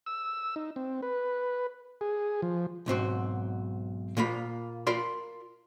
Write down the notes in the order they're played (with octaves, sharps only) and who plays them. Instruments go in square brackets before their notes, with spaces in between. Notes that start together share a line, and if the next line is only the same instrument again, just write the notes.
[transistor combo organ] E6
D#4
C4
B4
G#4
F3
[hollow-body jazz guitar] B1 G#2 C4 F#4
A#2 A#3 F4 B5
F4 A#4 D5 B5 C6